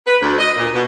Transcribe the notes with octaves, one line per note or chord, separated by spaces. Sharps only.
B4
D2
D#5
A#2
B2